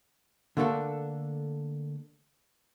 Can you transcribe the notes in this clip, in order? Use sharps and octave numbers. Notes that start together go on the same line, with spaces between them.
D3 A3 A#3 D4 A4